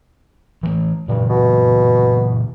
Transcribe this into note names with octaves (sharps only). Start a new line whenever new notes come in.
E3 F3 A3
G2 A#2 C#3 E3
B2